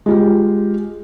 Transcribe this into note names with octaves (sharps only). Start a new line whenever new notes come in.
G#3 F4 G4